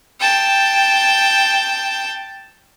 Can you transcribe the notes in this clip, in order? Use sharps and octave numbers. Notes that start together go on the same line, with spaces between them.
G5 A5